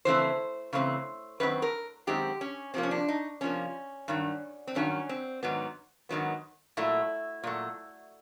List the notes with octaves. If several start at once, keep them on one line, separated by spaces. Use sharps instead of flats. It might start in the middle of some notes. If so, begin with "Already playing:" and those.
C#3 E3 A3 C4 C5
C#3 E3 A3 C4
F#2 D#3 C4 B4
A#4
F#2 D#3 G#3 C4 G4
C#4
C3 F3 A#3 C4
C#4
D4
D#4
C3 F3 A#3 C#4
G2 D#3 F#3
C4
G2 D#3 F#3 C#4
C4
G#2 D#3 F#3 B3
G#2 D#3 F#3 B3
A#2 F#3 A3 E4
A#2 F#3 A3